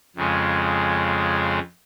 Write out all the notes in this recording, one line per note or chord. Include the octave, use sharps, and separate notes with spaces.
F2 C#3 G#3 C#4